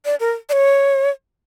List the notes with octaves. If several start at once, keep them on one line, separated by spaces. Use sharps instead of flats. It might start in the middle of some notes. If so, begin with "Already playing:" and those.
D5
A#4
D5
C#5